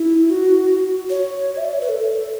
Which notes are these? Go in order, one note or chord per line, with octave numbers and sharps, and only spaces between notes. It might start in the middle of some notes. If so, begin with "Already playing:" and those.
Already playing: E4
F#4
C#5
E5
D5
C#5
B4
A4